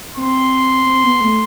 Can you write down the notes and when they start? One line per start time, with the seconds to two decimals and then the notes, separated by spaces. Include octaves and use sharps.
0.17 C4 C6
0.86 C4
1.03 B3
1.21 A3